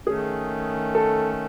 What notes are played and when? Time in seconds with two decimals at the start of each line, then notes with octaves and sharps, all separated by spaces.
0.06 D#3 A3 C#4 G#4
0.95 A4